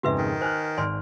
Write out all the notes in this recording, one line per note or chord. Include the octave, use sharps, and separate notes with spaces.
F2 G#2 C#3 F#4 B4 E5
D#3
C5 G#5 F6 F#6
G#1 D5 G#5 C6 F6